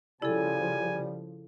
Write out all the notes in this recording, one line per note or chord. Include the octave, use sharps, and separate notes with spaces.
C#3 F3 G3 E4 A4 G#5